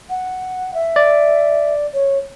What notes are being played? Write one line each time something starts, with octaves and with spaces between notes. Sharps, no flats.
F#5
E5
D5
C#5